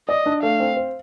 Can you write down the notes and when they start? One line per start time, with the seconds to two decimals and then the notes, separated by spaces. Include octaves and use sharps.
0.08 D5 D#5
0.26 D4
0.43 A3 F5
0.60 C4
0.77 C5